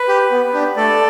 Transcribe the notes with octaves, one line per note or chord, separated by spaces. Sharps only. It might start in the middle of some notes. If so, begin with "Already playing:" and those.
Already playing: B4
G4
B3
D4 G4
A3 A4 D5